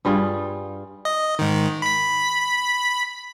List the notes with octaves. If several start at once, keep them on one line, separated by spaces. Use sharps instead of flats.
G2 G3 F4 G#4
D#5
G#2 D#3
B5 B6